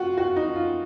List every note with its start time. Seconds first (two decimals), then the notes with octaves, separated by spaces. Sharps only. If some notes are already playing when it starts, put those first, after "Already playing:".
Already playing: F4 F#4
0.17 F#4
0.36 D#4
0.55 F4